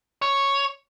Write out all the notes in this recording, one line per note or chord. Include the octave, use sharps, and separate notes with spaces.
C#5